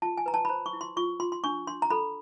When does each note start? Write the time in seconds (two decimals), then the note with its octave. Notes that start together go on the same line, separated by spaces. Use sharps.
0.02 F4 A5
0.18 G#5
0.26 B4 A#5
0.34 A5
0.45 B5
0.49 C5 A#5
0.66 C#6
0.73 E4
0.81 C6
0.97 F4 C#6
1.20 F4 C6
1.32 C6
1.44 D4 C#6
1.67 D4 C6
1.82 A#5
1.90 A4 B5